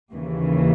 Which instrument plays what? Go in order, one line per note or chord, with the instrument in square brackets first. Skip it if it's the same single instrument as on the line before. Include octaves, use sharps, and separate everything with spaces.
[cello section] D#2 C#3 E3